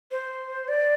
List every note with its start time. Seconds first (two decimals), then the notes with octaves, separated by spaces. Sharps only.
0.11 C5
0.68 D5